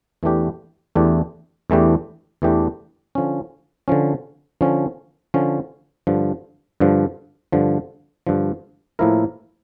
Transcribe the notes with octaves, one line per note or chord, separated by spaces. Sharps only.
E2 E3 A3 D4 G4
E2 E3 A3 D4 G4
E2 E3 A3 D4 G4
E2 E3 A3 D4 G4
D3 F3 C#4
D3 F3 C#4
D3 F3 C#4
D3 F3 C#4
G2 D3 F3
G2 D3 F3
G2 D3 F3
G2 D3 F3
A2 F3 A#3 E4 A#4